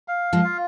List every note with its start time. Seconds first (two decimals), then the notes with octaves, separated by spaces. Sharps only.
0.08 F5
0.33 F3 G#3
0.44 F4